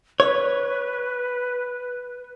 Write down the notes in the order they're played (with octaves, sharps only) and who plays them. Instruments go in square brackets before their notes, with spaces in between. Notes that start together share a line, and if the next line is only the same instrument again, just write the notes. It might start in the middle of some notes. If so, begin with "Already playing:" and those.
[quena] B4 [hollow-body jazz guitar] C#5